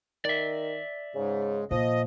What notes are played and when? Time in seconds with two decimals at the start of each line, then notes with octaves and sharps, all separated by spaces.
0.25 D#3 D5 E5
1.15 G#2 C#3
1.71 A#2 F3 D#5